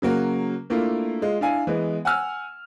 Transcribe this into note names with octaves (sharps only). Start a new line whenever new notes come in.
C#3 F#3 A#3 F#4
A3 A#3 D4 E4 F4
G#3 F4
D4 E4 F5 G#5
E3 G#3 B3
F#5 G#5 E6 F6